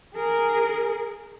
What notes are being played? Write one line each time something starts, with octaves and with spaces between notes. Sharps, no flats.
G#4 A#4